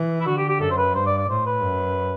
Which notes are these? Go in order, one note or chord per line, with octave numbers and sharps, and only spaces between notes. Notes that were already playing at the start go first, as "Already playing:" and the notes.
Already playing: E3
E4
D3 F#4
G4
G4
F#2 A4
C5
B4
G2 C5
D5
D5
A2 C5
B4
F#2